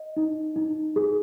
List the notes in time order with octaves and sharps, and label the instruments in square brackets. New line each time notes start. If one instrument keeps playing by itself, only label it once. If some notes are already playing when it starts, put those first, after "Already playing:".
Already playing: [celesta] D#5
D#4
D#4
G#4